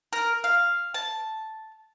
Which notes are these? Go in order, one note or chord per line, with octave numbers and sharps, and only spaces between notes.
A#4
F5
A5